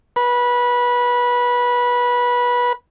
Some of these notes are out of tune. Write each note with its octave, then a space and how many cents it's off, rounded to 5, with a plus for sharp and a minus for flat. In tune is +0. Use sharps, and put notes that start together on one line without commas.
B4 -20